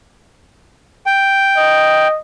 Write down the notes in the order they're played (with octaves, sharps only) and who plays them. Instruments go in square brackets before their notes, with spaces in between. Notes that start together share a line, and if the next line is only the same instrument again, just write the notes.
[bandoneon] G5
[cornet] D#5